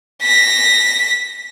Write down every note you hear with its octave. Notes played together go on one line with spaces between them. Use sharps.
A#6 B6